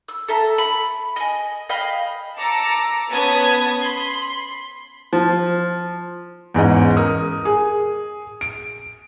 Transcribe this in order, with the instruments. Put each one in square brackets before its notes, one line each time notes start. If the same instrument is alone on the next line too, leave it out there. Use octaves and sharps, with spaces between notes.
[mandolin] E6
A4 E5 A#5
B5
D#5 G#5
D#5 F5 G5 B5
[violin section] A5 A#5 D6 E6 C#7
B3 C#4 B4 A5 D#6 G#6
B5 C6
[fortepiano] F3
[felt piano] E2 G#2 C#4 D#5
A#4 D#6
G#4
D7